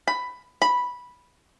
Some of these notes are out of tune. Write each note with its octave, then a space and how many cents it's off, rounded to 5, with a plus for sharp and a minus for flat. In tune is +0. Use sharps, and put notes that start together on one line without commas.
B5 +10
B5 -5